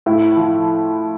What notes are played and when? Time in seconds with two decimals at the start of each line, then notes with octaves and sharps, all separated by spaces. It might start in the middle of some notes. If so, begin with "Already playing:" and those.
0.06 A2 E4
0.36 F3